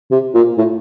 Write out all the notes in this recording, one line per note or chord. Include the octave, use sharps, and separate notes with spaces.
C3
A#2
A2